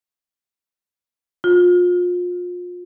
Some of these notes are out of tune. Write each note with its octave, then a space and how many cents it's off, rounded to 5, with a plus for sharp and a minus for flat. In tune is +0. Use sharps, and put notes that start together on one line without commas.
F4 +30